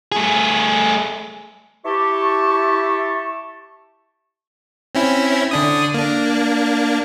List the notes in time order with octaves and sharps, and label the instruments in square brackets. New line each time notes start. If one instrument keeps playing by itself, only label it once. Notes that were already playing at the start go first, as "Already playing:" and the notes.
[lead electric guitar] A3 G#4
[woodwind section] E4 G4 A5 C#6
[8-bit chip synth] C4 C#4 E4
D3 D4 D#6
A#3 D4